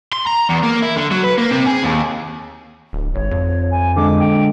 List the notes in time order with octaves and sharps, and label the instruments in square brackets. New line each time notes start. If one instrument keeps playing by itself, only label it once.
[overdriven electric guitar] C6
A#5
E2
A#3
E4
D3
F#3
B4
A#3
C3
G#4
D#2
[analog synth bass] D1
[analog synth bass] G#1 [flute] C#5
[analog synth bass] F2
[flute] G#5
[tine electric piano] D3 G#3 D4 [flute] D6
[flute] G5